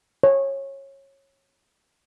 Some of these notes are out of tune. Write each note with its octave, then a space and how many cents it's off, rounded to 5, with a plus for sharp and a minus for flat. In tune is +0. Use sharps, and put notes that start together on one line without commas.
C#5 -20